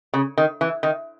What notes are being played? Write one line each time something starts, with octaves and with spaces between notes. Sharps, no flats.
C#3
D#3
E3
D#3